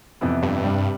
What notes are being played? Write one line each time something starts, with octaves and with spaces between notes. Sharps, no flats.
F2 C3 E3 B3 E4
G2
C3 G3 D4